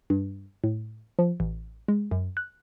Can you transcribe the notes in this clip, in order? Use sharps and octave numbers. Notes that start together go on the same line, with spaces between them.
G2
A2
F3
A1
G#3
F#2
F#6